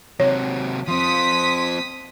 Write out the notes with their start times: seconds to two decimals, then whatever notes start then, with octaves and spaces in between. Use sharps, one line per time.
0.20 C3 F#3 C#5
0.88 F3 C4 C6 D#6 B6